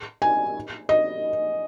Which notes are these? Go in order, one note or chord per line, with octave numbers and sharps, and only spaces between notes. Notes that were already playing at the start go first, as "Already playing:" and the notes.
G#5
D#5